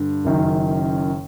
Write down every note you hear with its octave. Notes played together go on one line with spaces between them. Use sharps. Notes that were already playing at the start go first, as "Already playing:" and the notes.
Already playing: G2 D3
F#1 F#2 D#3